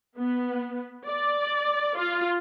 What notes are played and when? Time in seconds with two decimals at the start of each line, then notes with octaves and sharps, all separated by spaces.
0.18 B3
1.07 D5
1.97 F4